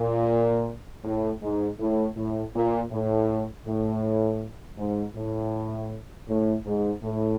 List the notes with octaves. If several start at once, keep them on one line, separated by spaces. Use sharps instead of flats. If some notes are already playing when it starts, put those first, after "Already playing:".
Already playing: A#2
A2
G#2
A2
A2
A#2
A2
A2
G#2
A2
A2
G#2
A2